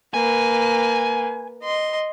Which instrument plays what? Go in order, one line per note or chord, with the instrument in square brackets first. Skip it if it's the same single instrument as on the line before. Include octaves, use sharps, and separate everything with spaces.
[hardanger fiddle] A#3 B4 [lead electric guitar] G#5
[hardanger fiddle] D#5 C6